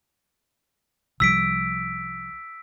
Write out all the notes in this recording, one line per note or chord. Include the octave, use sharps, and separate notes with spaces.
C2 F3 G3 E6 B6 D7